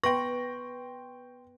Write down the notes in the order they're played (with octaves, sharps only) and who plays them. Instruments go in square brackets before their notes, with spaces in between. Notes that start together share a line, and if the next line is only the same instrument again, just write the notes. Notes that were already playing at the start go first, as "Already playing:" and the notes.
[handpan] B3 B4 [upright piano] G5 C6 A#6 [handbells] C#6